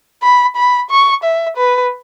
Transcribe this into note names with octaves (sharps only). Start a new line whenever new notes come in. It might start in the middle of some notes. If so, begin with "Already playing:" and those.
B5
B5
C#6
E5
B4